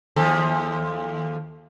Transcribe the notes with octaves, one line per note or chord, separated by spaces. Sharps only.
D#2 F3 A4